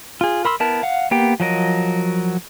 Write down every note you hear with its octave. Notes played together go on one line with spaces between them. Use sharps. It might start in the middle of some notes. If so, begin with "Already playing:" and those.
F4 G#4
A#4 B5 C6 E6
B3 E4 A#4 A5
F5 F#5
A#3 B3 G4 G5
F3 F#3 A#4 D#5